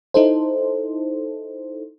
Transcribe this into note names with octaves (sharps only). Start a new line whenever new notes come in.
D#4 E4 A4 C5